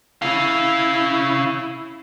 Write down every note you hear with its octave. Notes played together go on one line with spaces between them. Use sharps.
C#4 E4 F5